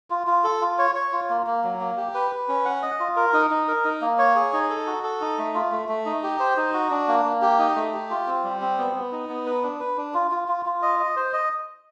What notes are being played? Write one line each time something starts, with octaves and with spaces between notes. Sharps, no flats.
F4
F4
A4
F4
C#5
C#5
F4
A#3
A#3
F#3
A#3
G4
B4
B4
C#4
F#5
D#5
F4
A#4
D#4
D#4
A#4
D#4
A#3
C#5
G#4
D#4
A4
F#4
A4
D#4
A3
F4
A3
A3
D#4
G4
C5
D#4
F#4
D4
A#3
A#3
G4
D#4
A3
G4
F4
C4
G3
C4
B3
B3
D#4
B3
B4
D4
B4
D4
F4
F4
F4
F4
D#5
D#5
C5
D#5